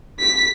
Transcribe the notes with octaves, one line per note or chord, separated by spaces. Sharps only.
B6